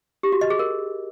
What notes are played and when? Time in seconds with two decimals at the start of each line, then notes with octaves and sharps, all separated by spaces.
0.23 G4
0.32 F#4
0.41 D#5
0.50 G#4
0.59 A#4